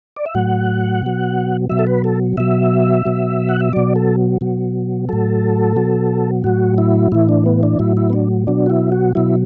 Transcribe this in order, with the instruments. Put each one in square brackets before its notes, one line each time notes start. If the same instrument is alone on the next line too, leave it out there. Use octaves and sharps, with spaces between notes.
[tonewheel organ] D5
E5
A2 F#3 F#5
B2 F#3
B2 F#3 E5
A4
B4
A4
B2 F#3 E5
B2 F#3
F#5
E5
B2 F#3 D5
A4
B2 F#3
A2 F#3 A4
B2 F#3
A2 F#3 F#4
E4
A2 E3 E4
D4
B3
D4
A2 F#3 E4
E4
B3
D4
B2 F#3 D4
F#4
E4
F#4
B2 F#3 E4